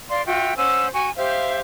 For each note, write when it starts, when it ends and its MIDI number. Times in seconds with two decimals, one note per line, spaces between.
0.09 0.23 74
0.09 0.23 77
0.09 0.23 84
0.26 0.54 65
0.26 0.54 66
0.26 0.54 76
0.26 0.54 79
0.56 0.87 61
0.56 0.87 72
0.56 0.87 78
0.56 0.87 88
0.93 1.10 66
0.93 1.10 80
0.93 1.10 85
1.16 1.60 67
1.16 1.60 72
1.16 1.60 76
1.16 1.60 77